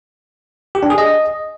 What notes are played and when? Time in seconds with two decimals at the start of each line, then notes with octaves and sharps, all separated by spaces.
0.75 G4
0.83 D4
0.90 G#4
0.98 D#5